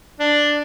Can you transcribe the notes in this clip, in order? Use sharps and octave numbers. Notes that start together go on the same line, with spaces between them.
D4